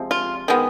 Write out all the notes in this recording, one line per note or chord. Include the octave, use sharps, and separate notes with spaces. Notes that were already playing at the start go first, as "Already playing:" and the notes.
Already playing: C3 F3 G#3
F4
D#3 G#3 B3